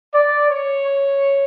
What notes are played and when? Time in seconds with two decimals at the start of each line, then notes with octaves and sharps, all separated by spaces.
0.14 D5
0.49 C#5